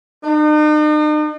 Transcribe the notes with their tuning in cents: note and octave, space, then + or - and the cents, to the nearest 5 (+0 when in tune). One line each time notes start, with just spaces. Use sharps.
D#4 -45